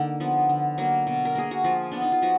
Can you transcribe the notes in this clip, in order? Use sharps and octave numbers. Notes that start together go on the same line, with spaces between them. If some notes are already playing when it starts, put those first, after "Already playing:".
Already playing: D3 A#3 D#4
F3 B3
D3
F#3 A#3
B2
A#4
A#3 G#4
F#4
F3 F4
B3 D4
D#4
F4
F3 F#4